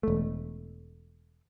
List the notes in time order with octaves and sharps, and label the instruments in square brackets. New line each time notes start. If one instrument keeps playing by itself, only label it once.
[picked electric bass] E1 A3